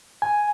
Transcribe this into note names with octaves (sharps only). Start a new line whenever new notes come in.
G#5